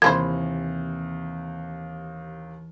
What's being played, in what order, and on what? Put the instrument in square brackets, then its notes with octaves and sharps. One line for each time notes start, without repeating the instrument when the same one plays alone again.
[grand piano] D#2 C3 [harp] E3 [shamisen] A#3 E4 C5 [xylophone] G#6